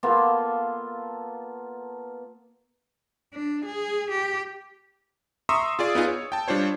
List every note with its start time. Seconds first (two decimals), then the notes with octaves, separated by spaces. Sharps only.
0.03 A#3 B3 F4 A4
3.34 D4
3.65 G#4
4.10 G4
5.49 E5 A#5 C6 C#6 D#6 E6
5.79 F4 G#4 D5
5.95 B3 D#4 F4 G#4
6.08 C#5
6.32 G5 A5
6.48 G3 D4 F4 C5 C#5